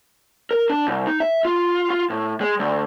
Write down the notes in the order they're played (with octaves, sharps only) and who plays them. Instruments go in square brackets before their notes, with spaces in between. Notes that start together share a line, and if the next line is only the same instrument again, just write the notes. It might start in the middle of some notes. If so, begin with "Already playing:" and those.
[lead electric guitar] A#4
D4
C2
D#4
E5
F4
F4
A2
G#3
D2